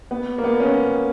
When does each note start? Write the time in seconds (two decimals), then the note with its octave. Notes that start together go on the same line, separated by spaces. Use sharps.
0.11 B3
0.38 A#3
0.44 B3
0.60 C#4